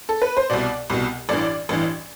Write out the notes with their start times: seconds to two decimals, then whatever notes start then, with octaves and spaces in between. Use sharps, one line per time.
0.09 A4
0.22 B4
0.37 C5
0.50 C2 B2 D5
0.90 C2 B2
1.29 A1 G2 E3 D5
1.69 A1 G2 E3